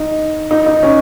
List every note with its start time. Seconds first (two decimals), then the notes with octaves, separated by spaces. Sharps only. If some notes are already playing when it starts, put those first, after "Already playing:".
Already playing: D#4
0.51 D#4
0.66 D#4
0.83 C#4